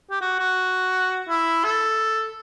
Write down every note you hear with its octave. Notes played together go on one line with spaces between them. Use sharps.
G4
F#4
F#4
E4
A4